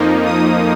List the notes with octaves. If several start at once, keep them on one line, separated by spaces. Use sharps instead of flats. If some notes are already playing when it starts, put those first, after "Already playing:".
Already playing: F2 F3 A#3 D#4
D#6